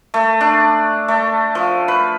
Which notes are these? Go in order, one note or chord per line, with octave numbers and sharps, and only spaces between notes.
A3
D4
A3
F3
B4